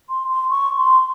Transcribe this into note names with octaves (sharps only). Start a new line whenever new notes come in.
C6
C6
C#6
C6